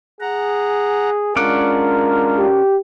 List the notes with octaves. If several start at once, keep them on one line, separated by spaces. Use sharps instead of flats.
G#4 F#5 A#5
G#3 C#4 D4 F4 A#4 D5 F#5
G4